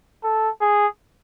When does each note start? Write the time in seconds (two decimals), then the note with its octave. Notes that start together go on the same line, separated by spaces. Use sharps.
0.23 A4
0.61 G#4